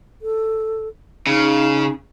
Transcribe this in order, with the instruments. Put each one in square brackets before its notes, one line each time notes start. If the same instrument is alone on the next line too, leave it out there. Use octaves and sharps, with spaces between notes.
[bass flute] A4
[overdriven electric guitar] C#3 [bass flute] D#4